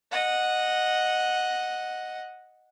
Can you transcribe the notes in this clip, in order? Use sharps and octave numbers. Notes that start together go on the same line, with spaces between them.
D#5 F#5